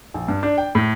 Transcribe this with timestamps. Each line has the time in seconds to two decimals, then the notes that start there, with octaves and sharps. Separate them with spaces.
0.14 A#1
0.28 G2
0.43 D4
0.58 G5
0.75 A2